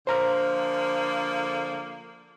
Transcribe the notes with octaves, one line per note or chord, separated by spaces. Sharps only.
D3 F3 A#3 C5 A#5 F6